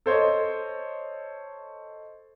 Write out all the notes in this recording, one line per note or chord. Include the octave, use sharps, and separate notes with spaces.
A4 C5 C#5 D#5